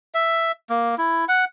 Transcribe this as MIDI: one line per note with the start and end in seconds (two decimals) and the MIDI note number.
0.15 0.52 76
0.70 0.95 58
0.98 1.25 64
1.28 1.45 78